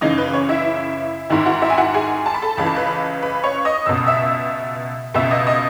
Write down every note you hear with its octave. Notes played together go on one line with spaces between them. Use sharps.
F#2 C#3 E3 D#4 D#5
B4
C#5
E4 E5
G#2 D#3 E4 E5
F#4 F#5
E4 E5
G#5
F#4 F#5
G#4 G#5
A5
B5
A4 A5
C#2 C#3 E3 B5
A5
B4 B5
B4 B5
C#5 C#6
D#5 D#6
C#2 B2 E6
D#6
E5 E6
C#2 B2 E5 E6
D#5 D#6
D#5 D#6